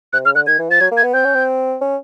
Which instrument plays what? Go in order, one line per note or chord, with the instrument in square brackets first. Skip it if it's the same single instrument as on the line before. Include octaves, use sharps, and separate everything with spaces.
[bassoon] C3 [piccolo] F#6
[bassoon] C#3 [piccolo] F6
[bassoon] D3 [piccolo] F#6
[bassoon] D#3 [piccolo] G#6
[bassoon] E3
[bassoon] F3 [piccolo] A6
[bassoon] F#3 [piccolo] G#6
[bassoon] A#3
[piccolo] G#6
[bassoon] B3
[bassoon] C4 [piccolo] G6
[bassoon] C#4
C4
C#4